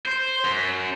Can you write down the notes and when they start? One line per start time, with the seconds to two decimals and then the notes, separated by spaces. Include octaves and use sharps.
0.06 C5
0.44 F#2